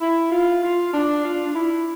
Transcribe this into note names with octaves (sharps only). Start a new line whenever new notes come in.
E4
F4
F4
D4
F4
D4
E4